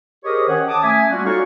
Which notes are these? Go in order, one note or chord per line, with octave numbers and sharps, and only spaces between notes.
G4 G#4 A#4 C5 C#5 D#5
D#3 C#4 C#5 F#5
A5 D6 D#6
A3 C#4 E5 G#5
G3 A#3 C#4 F4 F#4
D#4 F#4 A4 C#5 F5 C#6